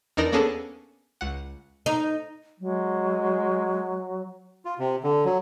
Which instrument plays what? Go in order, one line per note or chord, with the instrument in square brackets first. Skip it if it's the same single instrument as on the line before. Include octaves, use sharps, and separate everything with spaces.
[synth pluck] E2 D4 D#4 A#4 D5 A#6
A#3 B3 C#4 D4 G#4 A4
C#2 F#5
[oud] D#4
[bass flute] F#3 [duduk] G#3
[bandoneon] F4
C3
D3
F#3